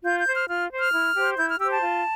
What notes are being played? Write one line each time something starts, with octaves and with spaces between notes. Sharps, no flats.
F4 G6
G6
C5
F6
F4 F6
C5
F6
E4
G4 C5
E4 G6
F6
G4 C5 E6
A5
F4